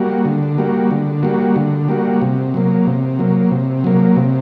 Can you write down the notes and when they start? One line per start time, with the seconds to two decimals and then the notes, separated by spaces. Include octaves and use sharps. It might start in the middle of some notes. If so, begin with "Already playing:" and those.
Already playing: G3 A#3 F#4
0.25 D3
0.58 G3 A#3 F#4
0.91 D3
1.23 G3 A#3 F#4
1.56 D3
1.88 G3 A#3 F#4
2.22 C3
2.54 F#3 A#3
2.87 C3
3.19 F#3 A#3
3.51 C3
3.84 F#3 A#3
4.16 C3